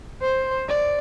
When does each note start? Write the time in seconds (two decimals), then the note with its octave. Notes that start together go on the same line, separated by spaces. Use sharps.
0.22 C5
0.69 D5